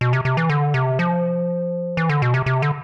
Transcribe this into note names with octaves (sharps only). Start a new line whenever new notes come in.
B2
C3
C3
E3
D3
C3
F3
E3
D3
B2
C3
C3
D3